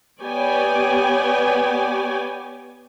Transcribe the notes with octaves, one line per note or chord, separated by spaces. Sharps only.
B3 G4 C#5 D5 G5 G#5